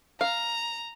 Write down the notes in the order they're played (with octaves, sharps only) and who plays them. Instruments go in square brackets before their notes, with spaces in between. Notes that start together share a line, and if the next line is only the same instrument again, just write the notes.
[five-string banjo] F5 [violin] A#5